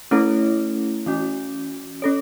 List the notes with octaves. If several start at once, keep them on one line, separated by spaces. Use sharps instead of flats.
A3 C#4 E4 A4 C#5
E3 C#4 F#4
C#4 A4 C#5